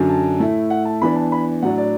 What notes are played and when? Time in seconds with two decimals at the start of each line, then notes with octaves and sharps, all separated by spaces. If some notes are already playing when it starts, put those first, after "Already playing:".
Already playing: F#2 D3 F#3 D4
0.09 A5
0.40 A2 A3 E4
0.70 F#5
0.85 A5
1.01 E2 E3 D4 B5
1.16 A5
1.32 B5
1.62 A2 F#3 D4 F#5
1.78 D5